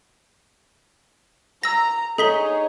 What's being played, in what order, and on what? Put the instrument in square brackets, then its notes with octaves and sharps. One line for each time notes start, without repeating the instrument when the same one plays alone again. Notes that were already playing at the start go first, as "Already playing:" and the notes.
[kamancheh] A#5 [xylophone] E6 A#6
[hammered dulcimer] D#4 [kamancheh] G#4 C#5 [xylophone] A4 B6 G7